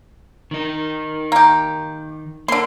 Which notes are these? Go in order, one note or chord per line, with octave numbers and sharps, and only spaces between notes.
D#3 D#4
A#3 G4
D3 A#3 C6